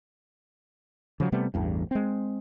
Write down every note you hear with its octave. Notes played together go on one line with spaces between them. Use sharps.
C#3 F3 F#3
C3 G3 A3 B3
A1 E2 G2
G#3 C4